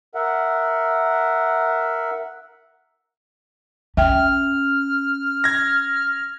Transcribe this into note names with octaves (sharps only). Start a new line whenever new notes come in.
A#4 E5 F#5
C#4 E5 G5 F6
G#6 A#6